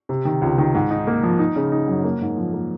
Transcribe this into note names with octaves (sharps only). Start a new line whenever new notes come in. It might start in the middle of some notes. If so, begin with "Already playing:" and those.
C3
D#3
C#2
D#3
G#2
D#4
A#3
F3
D#4
C#3
D#4
F#2
A#3
G#2
F3
A#3